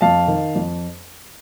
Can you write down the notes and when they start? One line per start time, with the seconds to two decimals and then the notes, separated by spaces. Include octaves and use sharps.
0.01 F2 F5 A5
0.28 D#3
0.55 F2